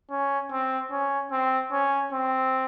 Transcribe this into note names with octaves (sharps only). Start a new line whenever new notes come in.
C#4
C4
C#4
C4
C#4
C4